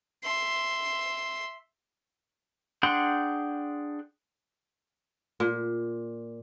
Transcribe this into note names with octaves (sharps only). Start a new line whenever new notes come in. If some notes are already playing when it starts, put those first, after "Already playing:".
E5 C6
D4 G#4 F#5 G5 C6
A#2